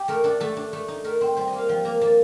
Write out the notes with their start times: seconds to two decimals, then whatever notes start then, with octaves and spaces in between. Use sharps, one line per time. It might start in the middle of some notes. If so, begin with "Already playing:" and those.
Already playing: G4
0.08 A3 A#4
0.24 D4 A4
0.40 A3 A4
0.57 D4
0.73 A3
0.88 D#4
1.04 A3 A#4
1.21 C4 C5
1.37 G3 C5
1.48 D#5
1.53 A#3
1.58 F5
1.69 F3 G5
1.85 A#3 A#5
2.01 A#3 A5